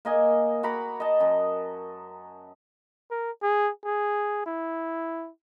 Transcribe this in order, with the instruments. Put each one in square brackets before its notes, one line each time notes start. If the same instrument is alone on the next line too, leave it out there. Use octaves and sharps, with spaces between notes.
[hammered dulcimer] A#3 D#5 G#5
F#4 A#5 B5 D6
D#5 A5
F#2
[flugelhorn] A#4
G#4
G#4
E4